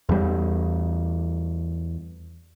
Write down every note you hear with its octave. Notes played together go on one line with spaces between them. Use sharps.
E2 G3